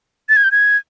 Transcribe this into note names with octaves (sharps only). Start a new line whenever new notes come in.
A6
G#6
G6
G#6